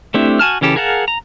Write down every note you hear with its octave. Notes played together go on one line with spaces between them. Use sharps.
A3 C4 D4 E4 G4
F#4 G#5 A5 F6
C#3 E3 C#4 G4 A4
G#4 A#4 F5 F#5 A5
A#5